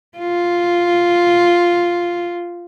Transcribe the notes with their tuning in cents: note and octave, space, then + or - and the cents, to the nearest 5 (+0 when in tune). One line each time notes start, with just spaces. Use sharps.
F4 +0